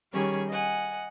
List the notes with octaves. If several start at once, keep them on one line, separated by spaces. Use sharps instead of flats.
D#3 G3 C#4 G4 G#4 C#5
D#5 F#5 G#5